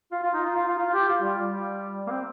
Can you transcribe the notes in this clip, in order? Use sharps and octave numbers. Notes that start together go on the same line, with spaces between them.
F4
F4
D#4
F4
F4
F4
F4
G4
F4
G3
G3
A#3
C4